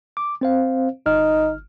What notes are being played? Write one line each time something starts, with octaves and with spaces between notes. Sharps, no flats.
D6
C4 C5 F5
G1 D#4 F6